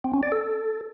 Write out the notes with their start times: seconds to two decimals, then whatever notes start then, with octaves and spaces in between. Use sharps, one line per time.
0.04 C4
0.14 C#4
0.23 D5
0.32 A4